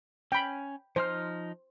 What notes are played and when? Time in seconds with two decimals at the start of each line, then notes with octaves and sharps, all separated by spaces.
0.32 C#4 G5 B5
0.96 F3 D#4 C5 F6